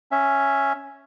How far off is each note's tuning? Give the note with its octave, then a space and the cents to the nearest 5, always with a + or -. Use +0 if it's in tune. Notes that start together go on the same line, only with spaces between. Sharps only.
C#4 +0 E5 +5